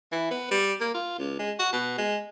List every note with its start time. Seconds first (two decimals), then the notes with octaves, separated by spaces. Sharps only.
0.12 E3
0.31 B3
0.51 G3
0.81 A#3
0.94 F4
1.18 C#2
1.39 G#3
1.59 F#4
1.73 B2
1.98 G#3